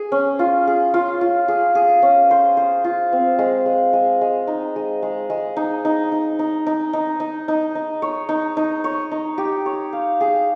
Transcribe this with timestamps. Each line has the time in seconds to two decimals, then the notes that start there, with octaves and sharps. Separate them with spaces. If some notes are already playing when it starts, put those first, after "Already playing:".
Already playing: G#4
0.12 C#4
0.39 F4
0.67 G#4
0.94 F4
1.21 F4
1.48 G#4
1.75 G#4
2.02 C#4
2.31 C5
2.57 C5
2.84 F4
3.12 C4
3.39 G#3
3.66 G#3
3.93 G#3
4.21 G#3
4.47 D#4
4.76 G#3
5.02 G#3
5.30 G#3
5.56 D#4
5.85 D#4
6.12 D#4
6.39 D#4
6.67 D#4
6.93 D#4
7.20 D#4
7.48 D#4
7.75 D#4
8.02 C#5
8.29 D#4
8.57 D#4
8.84 C#5
9.11 D#4
9.38 G4
9.66 C#5
9.93 F5
10.21 G#4